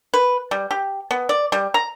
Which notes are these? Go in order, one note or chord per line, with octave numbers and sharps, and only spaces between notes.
B4
G3
G4
B3
D5
G3
A#5